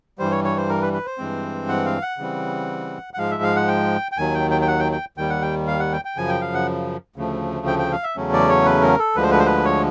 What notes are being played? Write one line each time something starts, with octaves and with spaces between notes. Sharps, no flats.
G2 E3 G3 C5
C#5
C#5
C5
A#4
B4
B4
C5
G2 E3 G#3 C4
F#5
F5
F#5
C#3 E3 G3 C4
F#5
G#2 F3 G#3 F5
E5
F5
F#5
G5
G5
D#2 D#3 F#3 G#5
G5
G5
G5
F#5
G5
G5
D#2 D#3 G3 G5
F#5
G5
F5
F#5
G5
G5
F#2 C#3 F3 G#5
G5
F5
F#5
D2 C#3 F3 A3
G5
G5
F5
E5
E2 C#3 F#3 A3 C#4
D5
C#5
B4
A#4
A4
D2 D3 F3 G#3 B4
C5
B4
C5
B4
C#5